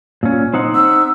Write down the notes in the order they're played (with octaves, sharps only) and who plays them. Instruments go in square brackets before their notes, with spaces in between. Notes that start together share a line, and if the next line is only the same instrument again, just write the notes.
[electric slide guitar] A#2 C#4
C4 D#4 F#5
[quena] E6